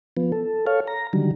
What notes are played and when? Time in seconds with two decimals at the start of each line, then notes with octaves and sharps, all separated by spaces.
0.17 F3 B3
0.32 A4
0.67 A4 C#5 F5
0.87 A#5
1.13 D3 D#3 F#3 G3